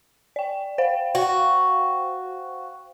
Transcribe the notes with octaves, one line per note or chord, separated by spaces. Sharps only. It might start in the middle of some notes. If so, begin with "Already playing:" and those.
D5 G5
C5 F5 G5
F#4